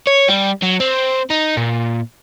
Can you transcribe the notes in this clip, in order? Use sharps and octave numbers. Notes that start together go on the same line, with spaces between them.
C#5
G3
F#3
C4
D#4
A#2